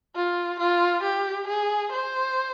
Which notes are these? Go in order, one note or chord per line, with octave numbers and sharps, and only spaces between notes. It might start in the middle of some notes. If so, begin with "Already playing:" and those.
F4
F4
G4
G#4
C5